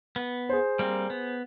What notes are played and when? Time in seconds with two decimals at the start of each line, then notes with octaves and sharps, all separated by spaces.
0.16 B3
0.49 G#4 C5
0.79 G3 A#3 C4
1.10 B3